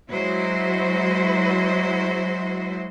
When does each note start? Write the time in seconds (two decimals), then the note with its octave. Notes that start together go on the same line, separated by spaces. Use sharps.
0.11 F#3 G#3 E4 F#4 C5